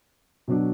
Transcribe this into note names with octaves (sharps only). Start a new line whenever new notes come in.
B2 F#3 D4